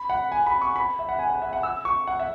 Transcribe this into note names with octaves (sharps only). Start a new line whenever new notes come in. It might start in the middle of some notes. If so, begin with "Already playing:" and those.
Already playing: B5
F#5
G#5
B5
C#6
B5
E5
F#5
G#5
F#5
E5
F#5
E6
C#6
F#5
E5